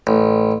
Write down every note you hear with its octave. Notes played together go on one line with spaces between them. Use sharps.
A1